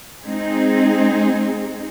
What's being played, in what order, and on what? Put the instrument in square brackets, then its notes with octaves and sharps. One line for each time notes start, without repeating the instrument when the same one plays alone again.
[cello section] G#3 C4 D#4 G#4